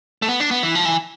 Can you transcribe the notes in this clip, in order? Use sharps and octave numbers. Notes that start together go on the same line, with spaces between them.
A3
B3
D4
B3
E3
F3
E3